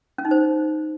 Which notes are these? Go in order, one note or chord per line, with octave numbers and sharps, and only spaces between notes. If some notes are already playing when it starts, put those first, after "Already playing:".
C#4
D#4
C5